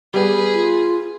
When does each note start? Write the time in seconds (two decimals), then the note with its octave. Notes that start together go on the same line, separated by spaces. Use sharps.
0.14 G3 B3 G#4 B4
0.52 F4